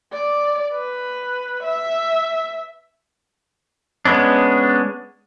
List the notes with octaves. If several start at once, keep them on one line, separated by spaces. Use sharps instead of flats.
D5
B4
E5
G#3 B3 C#4 D4